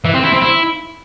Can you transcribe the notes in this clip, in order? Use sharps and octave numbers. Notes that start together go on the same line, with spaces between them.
E3
C4
E4
C4
E4